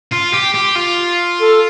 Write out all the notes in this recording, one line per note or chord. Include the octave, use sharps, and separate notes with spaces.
F4
G4
G4
F4
A4